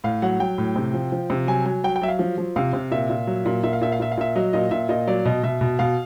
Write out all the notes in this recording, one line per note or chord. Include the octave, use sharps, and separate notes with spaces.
A2 F5
F#3 F#5
F#3 G5
A2
C3
F3
F3
C3
F#3 G#5
F#3 G#5
F#3 G5
G5
F#3 E5
F5
F3
F3
C3 F5
C3
A#2 E5
A#2
F#3
A#2
A#2 E5
F5
A#2 E5
F5
A#2 E5
F5
A#2 E5
F#3 D#5
A#2 D#5
A#2 E5
A#2 D#5
F#3 D5
B2 D#5
B2 E5
B2
B2 F5